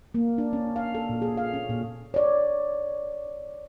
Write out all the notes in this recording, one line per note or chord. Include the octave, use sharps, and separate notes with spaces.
A#3
D4
C#4
F5
A4
A#2
G#4
F5
C#4
A#2
C#5 D5